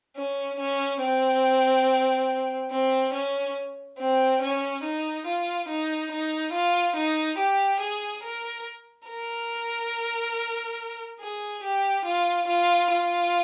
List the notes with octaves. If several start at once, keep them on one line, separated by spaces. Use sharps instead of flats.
C#4
C#4
C4
C4
C#4
C4
C#4
D#4
F4
D#4
D#4
F4
D#4
G4
G#4
A#4
A#4
G#4
G4
F4
F4
F4